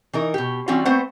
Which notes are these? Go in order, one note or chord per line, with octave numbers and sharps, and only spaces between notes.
E3 D#4 A#4
B2 G4
E3 G3 C4 C#4 F4 F#4
A3 B3 C4 C5 F#5